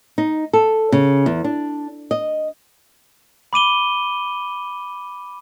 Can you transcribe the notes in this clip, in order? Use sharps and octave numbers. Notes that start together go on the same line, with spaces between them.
D#4
A4
C#3
E2
D4
D#5
B5 D6 D#7 G7